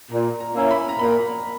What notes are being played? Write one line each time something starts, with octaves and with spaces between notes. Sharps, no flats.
A#2 A#5
A#5
A#3 C#4 E4
B5
A#5
A#2 B5